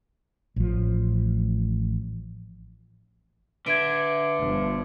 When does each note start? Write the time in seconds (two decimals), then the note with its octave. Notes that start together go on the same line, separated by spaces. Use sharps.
0.56 A1 F3
3.67 D3 B4 E5 G#6 D7
4.38 G1 F3